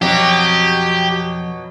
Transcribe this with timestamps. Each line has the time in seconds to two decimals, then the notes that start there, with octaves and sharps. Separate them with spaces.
0.02 F2 B2 F#3 G4